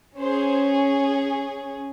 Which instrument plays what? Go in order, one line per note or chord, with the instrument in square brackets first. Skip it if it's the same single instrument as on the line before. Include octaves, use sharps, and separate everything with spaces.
[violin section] C#4 G#4 C5